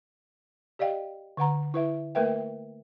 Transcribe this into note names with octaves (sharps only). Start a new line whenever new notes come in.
G4 D5 D#5 F5 G5
D3 B4 F#5 A#5
E4 B4 E5
A3 A#3 A#4 B4 E5 G5